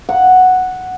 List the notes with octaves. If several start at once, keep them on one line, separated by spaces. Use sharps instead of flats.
F#5